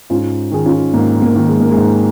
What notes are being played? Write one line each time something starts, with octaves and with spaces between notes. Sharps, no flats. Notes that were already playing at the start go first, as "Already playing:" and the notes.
G#2 C#4 F4
D#3 G#4
C#4 F4
G#2 A#3
A#3
D#3
G#3
A#3
G#3
G#2